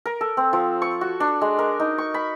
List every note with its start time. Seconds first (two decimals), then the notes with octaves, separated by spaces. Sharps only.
0.06 A#4
0.21 A4
0.37 C4
0.53 F3
0.82 C#6
1.01 F#4
1.20 D4
1.41 G#3
1.59 A#4
1.80 D#4
1.98 C#6
2.14 B5